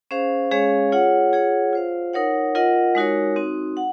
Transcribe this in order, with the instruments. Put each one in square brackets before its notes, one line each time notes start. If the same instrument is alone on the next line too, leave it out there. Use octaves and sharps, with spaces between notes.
[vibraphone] C#4 G#4 C5 F5
G#3 C#4 G#4 C#5 F5
F4 G#4 C#5 F#5
F4 G#4 C#5 F#5
F4 C5 F5
D#4 A#4 C#5 F#5
F4 A#4 D#5 F#5
G#3 D#4 F#4 A#4 C#5
C4 D#4 F#4
F#5